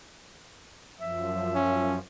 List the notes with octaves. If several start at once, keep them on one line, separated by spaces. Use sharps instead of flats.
F#2 F3 E5
C#4